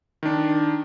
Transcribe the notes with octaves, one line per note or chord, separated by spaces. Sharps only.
D#3 D4